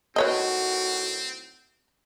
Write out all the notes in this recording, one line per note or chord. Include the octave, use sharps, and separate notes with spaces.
A2 D#3 C4 F#4 B4 C#5 D#5